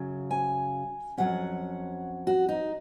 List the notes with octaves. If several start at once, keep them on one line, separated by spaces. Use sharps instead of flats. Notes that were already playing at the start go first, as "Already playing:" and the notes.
Already playing: F#2 C#3 F#3
G#5
F2 D#3 F#3 C#4 F#5
F#4
D#4